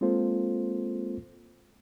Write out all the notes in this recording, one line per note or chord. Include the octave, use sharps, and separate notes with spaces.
G#3 A#3 C4 F4 A4 C5